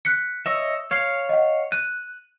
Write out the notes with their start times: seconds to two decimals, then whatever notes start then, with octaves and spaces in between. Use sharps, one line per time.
0.05 F#6 B6 C#7
0.46 C#5 D#5 E5 E6
0.91 C#5 F5 G#6 C7
1.29 D#5 F#5
1.72 F#6 D#7